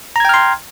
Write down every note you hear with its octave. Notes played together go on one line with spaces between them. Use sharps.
G5 A#5 C6 F6 G#6